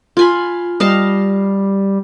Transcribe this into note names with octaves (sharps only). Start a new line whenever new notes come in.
F4 G#5 B5
G3 D#5 F5 A5